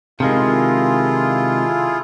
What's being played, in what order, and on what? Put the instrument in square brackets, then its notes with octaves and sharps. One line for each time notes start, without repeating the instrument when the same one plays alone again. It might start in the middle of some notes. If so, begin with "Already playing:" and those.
[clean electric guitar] C3 D#3 G#3 [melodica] E4 G#4 A4 [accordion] F4